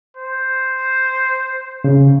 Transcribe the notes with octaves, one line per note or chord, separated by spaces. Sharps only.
C5
C#3